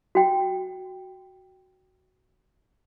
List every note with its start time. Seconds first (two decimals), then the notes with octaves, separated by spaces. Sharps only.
0.15 F#4 G5